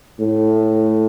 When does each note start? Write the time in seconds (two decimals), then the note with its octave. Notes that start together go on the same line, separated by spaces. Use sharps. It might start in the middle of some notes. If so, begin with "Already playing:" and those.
0.20 A2